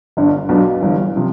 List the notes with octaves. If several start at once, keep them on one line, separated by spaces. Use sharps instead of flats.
G1 G2 D3
B1 B2 B3 D4 F4
G1 G2 E3
C3 F3